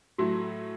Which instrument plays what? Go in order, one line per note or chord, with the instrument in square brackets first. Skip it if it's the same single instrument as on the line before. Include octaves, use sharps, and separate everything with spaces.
[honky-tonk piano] A2 F#3 A3 E4 [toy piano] F#4